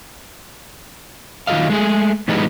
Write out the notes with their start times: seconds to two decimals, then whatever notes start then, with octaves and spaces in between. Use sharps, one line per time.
1.47 D#3 F#3 F4 A4 D#5 F5
1.70 G#3 A3 G#4
2.28 A2 E3 G3 G#3 B3 D#4